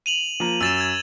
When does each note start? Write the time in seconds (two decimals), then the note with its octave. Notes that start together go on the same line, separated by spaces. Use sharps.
0.06 D#7 F7 F#7
0.40 F3 A#3 A#5
0.61 F#2 E6 A6 E7
0.81 G#6